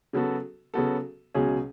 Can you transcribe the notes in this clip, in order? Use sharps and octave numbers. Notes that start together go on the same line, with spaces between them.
C#3 F#3 B3 F#4 A4
C#3 F#3 B3 F#4 A4
C#2 B2 F#3 C#4 G#4